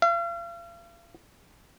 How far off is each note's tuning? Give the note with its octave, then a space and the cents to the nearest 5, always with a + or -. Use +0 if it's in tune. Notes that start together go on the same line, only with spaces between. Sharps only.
F5 -40